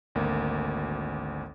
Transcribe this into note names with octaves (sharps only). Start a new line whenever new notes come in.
G#1 D2 A#3